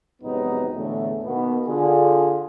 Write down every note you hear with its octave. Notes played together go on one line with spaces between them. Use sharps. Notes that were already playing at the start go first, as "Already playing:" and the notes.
A#1 G#2 C3 F#3 B3 D#4
E2 A2 D3 A3
B2 D#3 A#3 B3
D3 F4 G#4